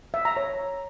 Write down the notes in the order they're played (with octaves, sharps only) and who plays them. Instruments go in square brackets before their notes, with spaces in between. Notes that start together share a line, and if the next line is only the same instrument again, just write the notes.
[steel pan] E5
A#5
C#5